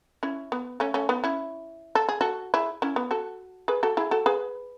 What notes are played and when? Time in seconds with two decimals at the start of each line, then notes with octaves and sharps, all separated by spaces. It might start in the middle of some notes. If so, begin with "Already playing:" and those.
0.23 C#4 E4
0.52 B3
0.80 A3 C#4
0.94 A3 C#4
1.09 B3 D#4
1.24 C#4 E4
1.95 A4
2.09 G#4
2.21 F#4 A4
2.54 E4 G#4
2.82 C#4 E4
2.96 B3
3.11 F#4 A4
3.68 G#4 B4
3.83 F#4 A4
3.97 E4 G#4
4.11 F#4 A4
4.26 G#4 B4